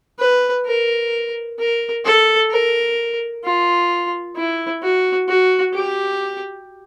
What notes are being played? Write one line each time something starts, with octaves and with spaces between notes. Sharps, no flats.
B4
A#4
A#4
A4
A#4
F4
E4
F#4
F#4
G4